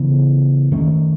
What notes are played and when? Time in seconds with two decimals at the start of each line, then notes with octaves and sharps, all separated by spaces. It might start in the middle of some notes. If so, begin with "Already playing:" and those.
Already playing: C#3 E3 B3
0.72 D#3 A3 C#4